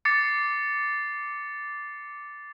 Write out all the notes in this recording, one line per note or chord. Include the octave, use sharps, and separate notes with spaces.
D6 A6 C7 C#7